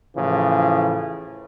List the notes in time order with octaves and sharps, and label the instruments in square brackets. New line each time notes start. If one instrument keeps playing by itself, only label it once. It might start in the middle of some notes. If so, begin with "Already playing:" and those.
[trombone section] A2 C#3 E3 F3